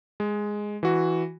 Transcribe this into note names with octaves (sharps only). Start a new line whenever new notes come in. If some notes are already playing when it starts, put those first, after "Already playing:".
G#3
E3 F#4